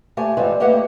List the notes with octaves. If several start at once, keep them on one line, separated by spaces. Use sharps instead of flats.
A3 G4 C5 G#5 A5
G2 E3 G3 G#3 C4 F4
A3 A#3 G4 B4 D#5 F#5